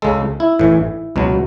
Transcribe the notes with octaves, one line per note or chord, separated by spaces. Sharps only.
C#2 C#3 G#3 A4
E4
A1 A2 E3
C#2 B2 F#3